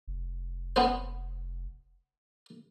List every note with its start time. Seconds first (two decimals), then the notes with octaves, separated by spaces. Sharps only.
0.07 F1
0.76 B3 C#4 C5